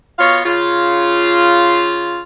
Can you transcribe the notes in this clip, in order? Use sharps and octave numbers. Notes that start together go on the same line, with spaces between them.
B2 F4 C#5 F5
C#3 F4